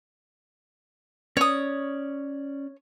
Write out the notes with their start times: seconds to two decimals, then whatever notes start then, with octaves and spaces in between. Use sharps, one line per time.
1.37 C#4 C#5 D5 D#6